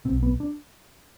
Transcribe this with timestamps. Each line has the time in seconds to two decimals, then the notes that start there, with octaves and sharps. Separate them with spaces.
0.05 B1 B2 C4
0.23 B3
0.40 D4